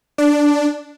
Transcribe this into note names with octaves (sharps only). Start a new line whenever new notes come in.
D4